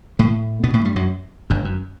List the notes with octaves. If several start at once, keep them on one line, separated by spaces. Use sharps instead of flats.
A2 A3
B2 B3
A2 A3
G2 G3
F#2 F#3
G1 G2
F#2